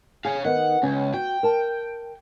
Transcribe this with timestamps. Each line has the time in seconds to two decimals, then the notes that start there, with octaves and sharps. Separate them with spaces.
0.25 G#4 C#5 F5
0.45 D#3 B3 F#5
0.83 C#2 C#4
1.14 F#4 G5
1.43 A#4 A5